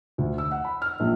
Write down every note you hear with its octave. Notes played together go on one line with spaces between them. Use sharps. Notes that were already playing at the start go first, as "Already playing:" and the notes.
D2
E6
F#5
B5
F6
A#1